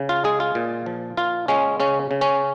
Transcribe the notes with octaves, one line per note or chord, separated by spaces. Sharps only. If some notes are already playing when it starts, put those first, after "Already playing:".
Already playing: C#3
F4
G#3 G#4
F4
A#2
F3
A#2 F4
G#3 C#4
C#3 C#4
C#3
C#4